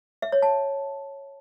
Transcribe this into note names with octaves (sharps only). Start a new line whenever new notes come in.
E5
C#5
A5